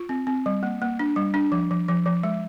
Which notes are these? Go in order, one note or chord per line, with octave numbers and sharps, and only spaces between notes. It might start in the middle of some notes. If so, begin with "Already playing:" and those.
Already playing: F4
C4
C4
G3
A#3
A#3
D4
G3
D4
F3
F3
F3
F3
G#3